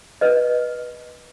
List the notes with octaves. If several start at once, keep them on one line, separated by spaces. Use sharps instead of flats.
B4 D#5